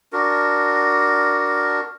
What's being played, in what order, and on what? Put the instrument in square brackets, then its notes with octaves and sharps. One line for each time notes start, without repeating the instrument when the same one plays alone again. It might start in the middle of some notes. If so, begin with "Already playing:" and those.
[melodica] D4 F#4 A#4